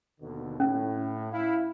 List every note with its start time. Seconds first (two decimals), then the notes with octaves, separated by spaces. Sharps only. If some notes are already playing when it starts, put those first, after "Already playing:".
0.21 D#2 B2 D3
0.60 A2 C#4
1.32 E4 F5